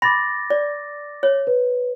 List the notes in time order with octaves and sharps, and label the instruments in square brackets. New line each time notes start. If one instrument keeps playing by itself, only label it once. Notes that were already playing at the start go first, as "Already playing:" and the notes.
[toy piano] B5 C6 [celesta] D6 A6 A#6
[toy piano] D5
C#5
[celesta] B4